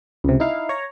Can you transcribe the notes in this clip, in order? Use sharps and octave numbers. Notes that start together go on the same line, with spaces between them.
C#2 C3
D#4 E4 F5
C#5 A#5